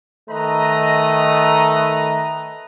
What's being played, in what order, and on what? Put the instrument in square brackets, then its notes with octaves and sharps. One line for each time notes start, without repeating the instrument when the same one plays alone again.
[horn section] D#3 A3 B4 D#5 A#5